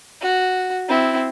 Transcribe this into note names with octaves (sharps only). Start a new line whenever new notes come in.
F#4
C4 E4